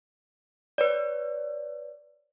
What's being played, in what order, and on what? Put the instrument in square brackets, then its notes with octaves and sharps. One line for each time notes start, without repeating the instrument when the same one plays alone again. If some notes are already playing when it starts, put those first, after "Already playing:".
[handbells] B4 C#5 D5